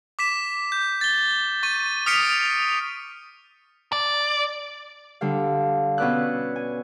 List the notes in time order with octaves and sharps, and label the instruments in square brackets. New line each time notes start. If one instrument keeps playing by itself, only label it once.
[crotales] D6 B6 E7
G6
A6 G7
C#6 A6 D#7
D#6 F6 B6 C#7 D7 F7
[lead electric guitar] D5
[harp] D3 G3 F5
B2 C#4 B4 D5 E6 F#6
G#5